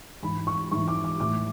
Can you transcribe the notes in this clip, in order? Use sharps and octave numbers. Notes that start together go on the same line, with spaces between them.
G#2 E3 B5
C#6
G#2 E3 C#6
D6
D6
A2 E3 D6